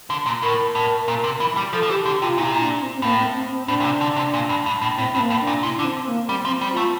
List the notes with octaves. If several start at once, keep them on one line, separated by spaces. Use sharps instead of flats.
D3
A#2
A2 A#4
A2
A#2
C3
E3
G3
F3 A4
F3
E3 G4
D3 G4
C3 F4
A#2 E4
C3
A#2
D4
C4
C4
A2 A#3
C4
C4
C4
A2 D4
A#2
C3
D3
C3
A#2
G2
G2
A2
A2 C4
G2 C4
A#3
A2
D4
A#2
C3 E4
D3 D4
C4
A#3
G3 C4
F3
C4
G3
A3 F4